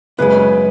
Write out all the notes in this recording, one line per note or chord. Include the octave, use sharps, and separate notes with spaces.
F#2 C#3 G#3 B4